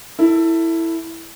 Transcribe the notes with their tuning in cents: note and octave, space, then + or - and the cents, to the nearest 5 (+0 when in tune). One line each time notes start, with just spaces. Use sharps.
E4 +0 A4 +25